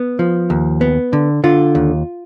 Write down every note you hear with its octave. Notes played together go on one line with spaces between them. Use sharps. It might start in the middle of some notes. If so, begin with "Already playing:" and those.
Already playing: B3
F3
D#2
B3
D3
D3 F4
D#2